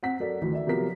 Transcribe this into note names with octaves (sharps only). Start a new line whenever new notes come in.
C4 F#5 B6
F#3 A4 A#4 D5
D2 D#3 E3
D5 E5
C3 F3 F#3 B3 A#4 B6